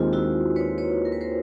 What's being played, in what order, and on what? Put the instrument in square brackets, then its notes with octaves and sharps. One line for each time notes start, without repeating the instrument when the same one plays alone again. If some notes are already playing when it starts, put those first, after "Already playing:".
Already playing: [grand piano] D#2 D#3 G#3 C4 [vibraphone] F4
[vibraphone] E4 F#4
B4 C#5
B4 C#5
A#4
B4
A#4 C5